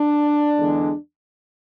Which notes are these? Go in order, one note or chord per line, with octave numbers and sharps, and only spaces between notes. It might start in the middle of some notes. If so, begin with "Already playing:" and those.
Already playing: D4
E2 D3 G#3